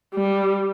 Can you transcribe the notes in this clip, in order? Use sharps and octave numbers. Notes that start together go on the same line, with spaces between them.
G3